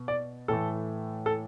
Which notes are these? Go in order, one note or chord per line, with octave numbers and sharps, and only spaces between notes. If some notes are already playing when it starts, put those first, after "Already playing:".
Already playing: B2
D5
A2 E3 A3 A4
A4